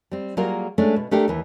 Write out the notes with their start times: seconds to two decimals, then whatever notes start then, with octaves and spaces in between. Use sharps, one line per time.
0.11 G3 C4
0.37 F#3 G3 A#3 F4 G#4 A#4
0.78 G#3 A3 C#4 D4 G#4
0.96 B2
1.11 A3 D4 G4 A4 A#4
1.28 D#2 E3